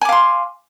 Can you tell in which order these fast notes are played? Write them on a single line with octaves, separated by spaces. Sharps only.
G#5 D6 F5 C6